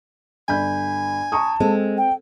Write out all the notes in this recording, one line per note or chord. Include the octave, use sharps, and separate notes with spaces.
G1 G#5 B5 G6
A5 A#5 C#6 D#6
G#3 C4 A4
G5